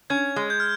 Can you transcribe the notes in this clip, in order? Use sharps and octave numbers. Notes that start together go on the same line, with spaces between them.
C#4 G#6
G#3
G6
F6